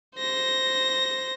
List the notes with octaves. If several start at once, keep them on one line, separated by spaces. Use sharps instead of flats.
C5 A#6